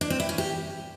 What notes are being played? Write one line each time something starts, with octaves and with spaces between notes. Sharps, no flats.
D4
C4
E4
C#4
G4